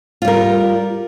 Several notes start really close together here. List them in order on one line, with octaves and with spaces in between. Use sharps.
F4 G3 A#4